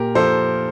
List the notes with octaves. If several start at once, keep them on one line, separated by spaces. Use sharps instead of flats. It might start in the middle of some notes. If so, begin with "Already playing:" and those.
Already playing: A#2 G4 A#4
F3 A4 C5